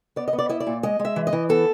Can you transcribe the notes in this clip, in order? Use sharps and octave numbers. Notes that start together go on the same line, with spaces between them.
B3 D5
D#5
B3
D5
E4 D#5
D5
A#2
G#3 D#5
G#3
E5
E3
D#5
E3
B3 A4